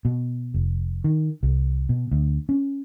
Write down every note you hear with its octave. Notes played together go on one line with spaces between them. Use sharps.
B2
F1
D#3
C2
B2
D2
C#4